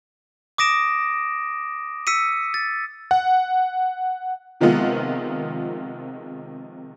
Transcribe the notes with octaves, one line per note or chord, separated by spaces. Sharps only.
D6 D#6 A#6 D7 E7
E6 B6 C#7 D#7
A6
F#5
C3 D#3 F3 G#3 B3 F4